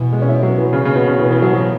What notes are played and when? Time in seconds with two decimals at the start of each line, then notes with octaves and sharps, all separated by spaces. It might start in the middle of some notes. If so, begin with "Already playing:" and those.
Already playing: B2 E3
0.13 G#3
0.22 C#4
0.28 E4
0.43 F#3
0.58 E3
0.73 C#3
0.85 C#3
0.96 B2
1.07 C#3
1.19 B2 E3
1.31 E3
1.42 F#3
1.53 F#3